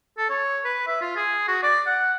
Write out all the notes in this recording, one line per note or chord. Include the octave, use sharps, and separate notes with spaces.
A4
C#5
B4
E5
F4
G#4
F#4
D5
F#5